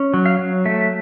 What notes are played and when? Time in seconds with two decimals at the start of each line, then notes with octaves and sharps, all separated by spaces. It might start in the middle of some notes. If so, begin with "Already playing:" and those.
Already playing: C#4
0.14 F#3
0.26 F5
0.39 F#3
0.65 A3 E5